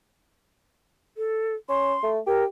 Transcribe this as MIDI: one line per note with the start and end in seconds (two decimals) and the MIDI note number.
1.17 1.54 69
1.69 1.94 61
1.69 2.10 84
2.03 2.19 57
2.27 2.46 67
2.27 2.43 70